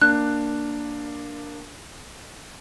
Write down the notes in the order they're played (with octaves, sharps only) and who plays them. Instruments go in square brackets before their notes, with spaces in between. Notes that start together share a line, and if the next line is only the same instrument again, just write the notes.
[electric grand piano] A#3 D4 [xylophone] F#6